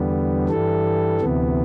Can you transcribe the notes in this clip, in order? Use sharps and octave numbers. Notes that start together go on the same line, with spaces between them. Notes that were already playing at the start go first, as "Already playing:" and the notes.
Already playing: E2 D3 G3 B3
G2 E3 G3 A4
D2 C3 E3 B3